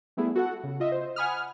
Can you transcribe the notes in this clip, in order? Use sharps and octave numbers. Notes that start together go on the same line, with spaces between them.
G3 A3 B3 E4 G#4
F#4 A4 F#5
C#3
F4 D#5 E5
C5
F#5 G#5 B5 D#6 F6